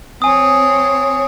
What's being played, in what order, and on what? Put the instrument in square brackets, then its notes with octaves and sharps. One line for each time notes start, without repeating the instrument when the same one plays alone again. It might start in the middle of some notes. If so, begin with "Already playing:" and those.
[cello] C4 C#5 [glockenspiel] G#5 D#6